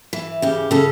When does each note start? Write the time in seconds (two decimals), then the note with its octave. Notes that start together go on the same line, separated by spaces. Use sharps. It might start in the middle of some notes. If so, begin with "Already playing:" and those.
0.13 E3
0.42 C#3 G4
0.71 C#3 A4